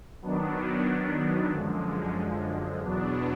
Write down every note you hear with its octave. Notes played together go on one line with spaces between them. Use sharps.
D#3 F#3 B3 D4
F#2 D3 F3 G#3
E2 B2 F#3 B3 D4